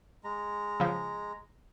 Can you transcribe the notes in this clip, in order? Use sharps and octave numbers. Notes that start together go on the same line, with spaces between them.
G#3 A#5
C#3 F3